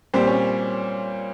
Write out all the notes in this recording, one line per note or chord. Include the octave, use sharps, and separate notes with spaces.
A#2 G3 C4 C5
C#4 C#5